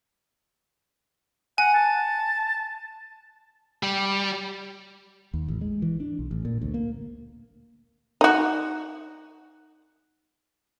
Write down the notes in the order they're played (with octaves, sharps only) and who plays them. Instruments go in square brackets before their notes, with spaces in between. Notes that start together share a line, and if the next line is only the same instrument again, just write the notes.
[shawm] F#5 [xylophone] G#5
[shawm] A5
[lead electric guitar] G3
[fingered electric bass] D#2
A1
G#3
E3
D4
B1
A1
A#2
D2
A#3
[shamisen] D#4 F#4